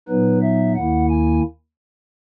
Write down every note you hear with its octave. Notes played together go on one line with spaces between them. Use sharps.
A#2 F#3 B3 D#4 B4
E5
D#2 D#3 A#3 E4 F#5
G#5